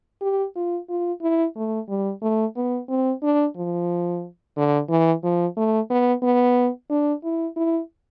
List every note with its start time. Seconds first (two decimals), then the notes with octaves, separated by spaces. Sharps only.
0.21 G4
0.56 F4
0.89 F4
1.22 E4
1.56 A3
1.89 G3
2.22 A3
2.56 B3
2.89 C4
3.23 D4
3.56 F3
4.57 D3
4.89 E3
5.23 F3
5.57 A3
5.90 B3
6.23 B3
6.90 D4
7.24 E4
7.56 E4